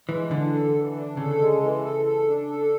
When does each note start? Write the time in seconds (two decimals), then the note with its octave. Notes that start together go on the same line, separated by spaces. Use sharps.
0.08 E3 G#3
0.30 D3 D4
0.53 A4
0.74 E3
0.96 D4
1.17 C#3 A4
1.39 G#3
1.62 E3
1.83 A4
2.05 A4
2.27 D4
2.49 A4